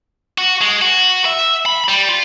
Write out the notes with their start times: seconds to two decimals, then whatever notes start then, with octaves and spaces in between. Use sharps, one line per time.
0.38 F#4
0.61 G#3
0.82 F#4
1.25 E5
1.66 B5
1.89 G3
2.09 F4